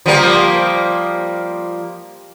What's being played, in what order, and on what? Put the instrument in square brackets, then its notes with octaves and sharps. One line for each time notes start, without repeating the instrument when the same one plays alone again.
[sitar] F3 G3 A#3